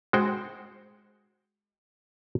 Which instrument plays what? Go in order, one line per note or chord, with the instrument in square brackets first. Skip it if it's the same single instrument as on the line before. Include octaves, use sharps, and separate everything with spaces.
[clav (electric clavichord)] G#3 F#4 C5 G5